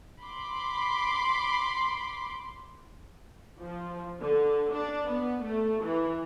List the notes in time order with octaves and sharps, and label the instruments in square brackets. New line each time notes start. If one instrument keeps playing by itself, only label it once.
[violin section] B5 C6 D6
[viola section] F3
D3
D4
B3
A3
E3